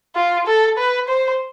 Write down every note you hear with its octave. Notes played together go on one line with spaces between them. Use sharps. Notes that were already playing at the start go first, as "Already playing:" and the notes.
F4
A4
B4
C5